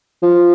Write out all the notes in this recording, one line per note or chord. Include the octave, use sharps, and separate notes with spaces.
F3